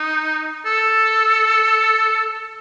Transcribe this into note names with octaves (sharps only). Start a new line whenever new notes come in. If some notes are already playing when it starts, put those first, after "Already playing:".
Already playing: D#4
A4